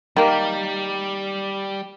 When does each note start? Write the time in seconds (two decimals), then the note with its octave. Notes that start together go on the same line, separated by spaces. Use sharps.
0.16 D#3 G3 A#3